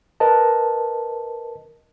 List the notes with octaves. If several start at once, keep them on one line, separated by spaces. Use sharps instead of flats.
A#4 B4 D#5 A5